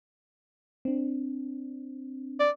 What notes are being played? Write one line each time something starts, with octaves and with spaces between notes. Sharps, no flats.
C4 D4
D5